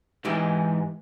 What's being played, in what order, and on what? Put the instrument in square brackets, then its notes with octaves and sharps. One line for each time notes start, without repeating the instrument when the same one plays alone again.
[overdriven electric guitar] G#2 [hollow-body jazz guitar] E3 D#4 G4